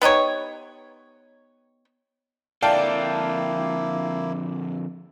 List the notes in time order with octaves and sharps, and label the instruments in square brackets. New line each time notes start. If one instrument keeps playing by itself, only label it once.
[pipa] B3 D#4 G4 C#5
[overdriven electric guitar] F2 D3 [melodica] A#3 E4 [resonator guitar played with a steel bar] D5 [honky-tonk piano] F5 G5 A5